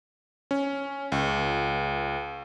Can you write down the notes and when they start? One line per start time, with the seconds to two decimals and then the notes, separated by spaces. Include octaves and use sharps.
0.51 C#4
1.12 C#2